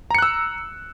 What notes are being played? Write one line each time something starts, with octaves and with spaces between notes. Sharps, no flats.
A#5 E6 F#6 C#7